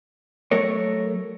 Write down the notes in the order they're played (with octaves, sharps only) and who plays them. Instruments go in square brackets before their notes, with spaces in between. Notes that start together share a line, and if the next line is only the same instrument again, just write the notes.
[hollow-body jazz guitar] F#3 A3 A#4 C#5